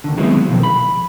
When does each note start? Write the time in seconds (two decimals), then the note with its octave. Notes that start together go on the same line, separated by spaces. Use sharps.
0.04 D#2 D3
0.17 D#3 F#3 G#3 B3 C4 E4
0.49 B2 D#3 F3
0.63 B5